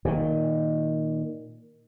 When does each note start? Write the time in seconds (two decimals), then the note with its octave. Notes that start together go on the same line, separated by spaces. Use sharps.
0.05 A#2 D#3